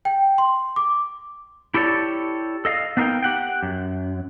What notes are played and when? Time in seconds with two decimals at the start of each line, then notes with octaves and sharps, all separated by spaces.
0.05 G5
0.38 C6
0.76 D6
1.74 E4 G4 A4 C#5 D5
2.65 A4 D#5 F5
2.97 B3 D4 D#4 A#4 F5 G5
3.23 G4 F#5 G5
3.63 F#2